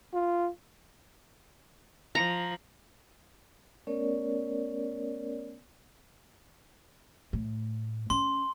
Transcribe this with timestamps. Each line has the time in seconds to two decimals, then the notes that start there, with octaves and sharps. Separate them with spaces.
0.14 F4
2.15 F3 A#5
3.87 A3 B3 C#4 A#4 C#5 D5
7.33 A2
8.10 C#4 C6